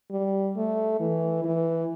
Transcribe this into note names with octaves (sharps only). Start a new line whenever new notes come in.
G3
A3
E3
E3